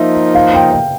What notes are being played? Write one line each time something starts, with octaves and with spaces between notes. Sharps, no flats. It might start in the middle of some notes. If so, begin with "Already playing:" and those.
Already playing: F3 A#3 D#4 E5
F5
G5
G5